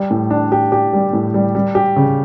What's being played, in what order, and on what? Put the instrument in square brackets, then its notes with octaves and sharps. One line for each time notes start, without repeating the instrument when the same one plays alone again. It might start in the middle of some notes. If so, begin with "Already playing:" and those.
Already playing: [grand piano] G3
A2
D4
G4
G4
G3
A2
G3
G3
G4
C#3